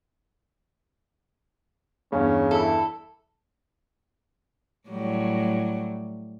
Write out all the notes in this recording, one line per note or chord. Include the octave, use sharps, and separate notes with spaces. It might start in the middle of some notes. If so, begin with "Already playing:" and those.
E2 G2 C#3 C#4
E4 A4
A2 F#3 G3